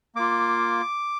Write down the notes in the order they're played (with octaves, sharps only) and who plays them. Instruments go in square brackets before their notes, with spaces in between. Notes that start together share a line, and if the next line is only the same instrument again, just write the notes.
[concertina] A#3 F4 D6